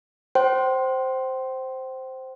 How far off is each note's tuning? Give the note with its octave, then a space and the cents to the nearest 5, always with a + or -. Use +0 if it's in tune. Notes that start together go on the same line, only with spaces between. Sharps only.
C5 +0 G5 -35